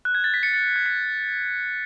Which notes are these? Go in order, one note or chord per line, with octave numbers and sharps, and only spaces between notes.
F#6
G#6
A6
B6
A6 C#7
A6 C#7
G#6
B6